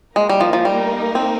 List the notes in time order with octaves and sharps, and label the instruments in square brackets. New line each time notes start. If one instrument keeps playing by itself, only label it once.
[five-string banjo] G#3 [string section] A#3 D#4 A#4
[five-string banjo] G3
F3
F3
G3
C4